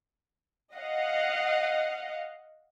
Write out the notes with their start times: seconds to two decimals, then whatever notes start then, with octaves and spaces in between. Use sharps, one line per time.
0.74 D#5 F5 F#5